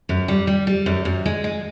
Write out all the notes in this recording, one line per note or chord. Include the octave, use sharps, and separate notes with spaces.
F#2
G3
G3
G3
F#2
F#2
G#3
G#3